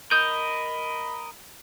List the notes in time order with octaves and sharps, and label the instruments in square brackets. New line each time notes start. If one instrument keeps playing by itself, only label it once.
[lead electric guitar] A#4 D#5 [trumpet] B5 [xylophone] G6